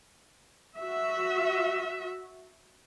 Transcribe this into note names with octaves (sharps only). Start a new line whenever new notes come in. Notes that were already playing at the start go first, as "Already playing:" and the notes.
F#4 E5